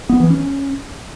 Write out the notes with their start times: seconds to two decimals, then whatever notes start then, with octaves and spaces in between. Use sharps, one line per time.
0.10 B3
0.20 E3
0.30 C#4